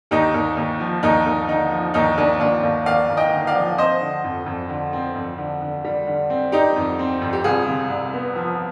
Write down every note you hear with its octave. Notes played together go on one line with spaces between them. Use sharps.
D#2 D#4 G4
D#2
D#2
F3
D#2 D#4
D#2
D3 D#4
F3
D#2 D#4
D#2 D4
D#2 D4 F4
D#2
D#2 D5 F5
D#2
D#5 G5
D3
D5 F5
F3
C4 C5 D#5
D3
F2
F2
D3
C4
F2
D3
D3
G3
D3
C4
G3 D#4 G4
F2
C4
F2
G4
C2 F4 G#4
C3
C2
B3
F3